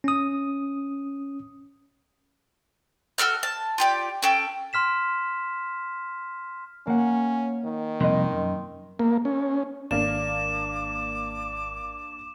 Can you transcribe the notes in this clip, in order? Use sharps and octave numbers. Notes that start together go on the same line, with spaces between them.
C#4 D#6
F#4 A4 E6 F6
A5
F4 G4 D5
C#4 A4 G5
C6 F6 B6 E7
A#3 C#4 F#5
D#3
C2 F2 A#3 D#5 C6
F#2
A#3
C#4
G#1 A#3 D4 D6 E7